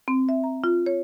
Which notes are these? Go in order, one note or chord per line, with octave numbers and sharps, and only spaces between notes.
C4
E5
A#5
F4
C#5